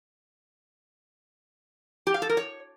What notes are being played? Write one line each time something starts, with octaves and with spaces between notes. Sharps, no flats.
G4
F5
A4
A#4
C#5